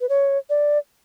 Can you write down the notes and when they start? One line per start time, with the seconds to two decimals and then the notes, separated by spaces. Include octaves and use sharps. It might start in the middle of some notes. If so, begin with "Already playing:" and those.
0.01 B4
0.09 C#5
0.50 D5